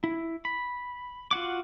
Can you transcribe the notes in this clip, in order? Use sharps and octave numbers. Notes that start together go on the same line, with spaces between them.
E4
B5
F4 F#4 F#5 D6